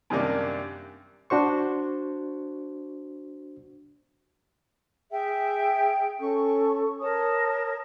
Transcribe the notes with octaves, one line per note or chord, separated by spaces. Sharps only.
F#2 C3 D#3 G3 A#3 D4
D4 F#4 C5 C#6
G#4 E5 G5
C#4 A4 C#6
A#4 C#5 A5 D#6